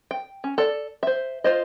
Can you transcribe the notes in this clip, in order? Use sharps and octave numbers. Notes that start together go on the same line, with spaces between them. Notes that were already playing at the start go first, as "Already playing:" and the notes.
G5
C#4
A4 D5
C5 E5
F4 C5 D#5